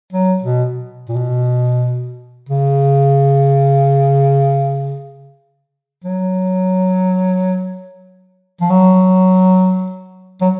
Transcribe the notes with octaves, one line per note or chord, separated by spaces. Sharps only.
F#3
B2
A#2
B2
C#3
F#3
F3
F#3
F#3